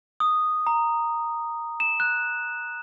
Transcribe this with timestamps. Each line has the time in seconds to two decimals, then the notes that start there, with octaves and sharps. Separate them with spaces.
0.20 D#6
0.67 A#5
1.80 E7
2.00 F#6